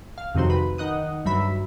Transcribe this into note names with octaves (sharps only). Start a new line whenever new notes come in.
F5
F2 C3 D#3 F#3 C5
B4
D#3 D#5 F#5 D#6
G2 F#3 E5 B5